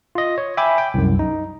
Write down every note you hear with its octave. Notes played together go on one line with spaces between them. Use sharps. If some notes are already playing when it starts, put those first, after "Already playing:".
F4 D#5
C#5
E5 G5 G#5 B5 D6
G5
C2 F#2
D#4